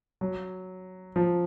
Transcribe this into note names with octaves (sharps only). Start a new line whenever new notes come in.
F#3
F3